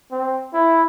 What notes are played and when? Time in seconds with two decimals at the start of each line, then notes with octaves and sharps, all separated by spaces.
0.11 C4
0.53 E4